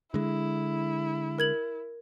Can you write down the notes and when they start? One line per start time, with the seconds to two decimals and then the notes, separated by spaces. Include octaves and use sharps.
0.14 D3 G#3 E4
1.38 A#4 G#6 F#7